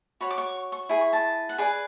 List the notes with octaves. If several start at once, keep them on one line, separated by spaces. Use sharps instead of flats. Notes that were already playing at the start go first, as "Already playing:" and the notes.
F#4 C#5 B5
D6
C#6
C#6
E4 G#4
C#6
A5
F#5
G#4 B4 D5 G#5